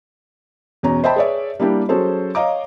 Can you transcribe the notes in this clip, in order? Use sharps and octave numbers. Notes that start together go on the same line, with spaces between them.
E2 B2 C#4 A#5
C5 D#5 E5 G5 A5 B5
G#4 B4 C#5 D5 E5
G3 A#3 D4 E4 G4
F#3 C#4 G#4 A4 C5
C#5 D#5 F5 A#5 D6